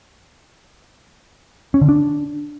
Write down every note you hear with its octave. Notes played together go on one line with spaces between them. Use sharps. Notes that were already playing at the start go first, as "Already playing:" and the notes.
C#4
D3
D4